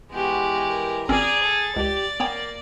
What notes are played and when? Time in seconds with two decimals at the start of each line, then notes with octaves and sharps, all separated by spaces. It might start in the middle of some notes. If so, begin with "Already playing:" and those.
0.12 E3 G#3 B3 F#4 G4
0.67 A#4
1.09 G#1 C4 C#4 G#4 D5 A#5
1.43 A4 A6
1.76 C#2 G4 D5
2.20 A#3 B3 C#5 G5